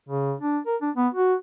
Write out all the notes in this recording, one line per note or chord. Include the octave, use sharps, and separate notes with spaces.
C#3
D4
A#4
D4
B3
F#4